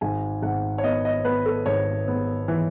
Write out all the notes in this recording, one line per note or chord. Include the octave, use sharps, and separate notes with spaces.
G#1 G#5
G#1 F#5
C#5
B3 D#5
D#5
B3 B4
A4
G#1 C#5
B3
E3